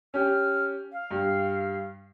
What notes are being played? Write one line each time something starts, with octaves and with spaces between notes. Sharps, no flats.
C#4 G4 F6
F5
G2